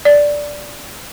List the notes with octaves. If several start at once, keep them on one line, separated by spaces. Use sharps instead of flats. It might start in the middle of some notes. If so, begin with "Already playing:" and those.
D5